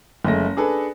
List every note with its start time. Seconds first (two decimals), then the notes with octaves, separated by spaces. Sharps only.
0.25 F#1 G#3 A3 A#6
0.57 D4 G#4 A4 B4